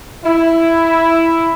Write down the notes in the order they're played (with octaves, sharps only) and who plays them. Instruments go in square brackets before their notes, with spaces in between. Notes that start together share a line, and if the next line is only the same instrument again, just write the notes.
[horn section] E4